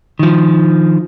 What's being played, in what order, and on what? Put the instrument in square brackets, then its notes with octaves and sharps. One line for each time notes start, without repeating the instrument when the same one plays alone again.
[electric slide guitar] D#3 F3